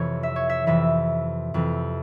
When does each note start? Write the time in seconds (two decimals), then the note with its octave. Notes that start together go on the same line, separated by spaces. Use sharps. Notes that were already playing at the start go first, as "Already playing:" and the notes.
Already playing: F2 C3 E3 C#5
0.23 E5
0.36 C#5
0.49 E5
0.67 F2 C3 E3 E5
1.54 F2 C3 E3